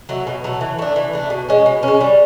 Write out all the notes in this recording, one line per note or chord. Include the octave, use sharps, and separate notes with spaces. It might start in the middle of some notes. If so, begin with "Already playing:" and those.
F#3 A3
B2
F#3 A3
E3
A3 D4
E3
A3 D4
B2
G#3 C#4
B2
G#3 C#4
G3